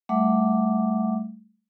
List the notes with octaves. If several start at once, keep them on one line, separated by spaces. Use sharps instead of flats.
G3 A3 E5 F#5 D6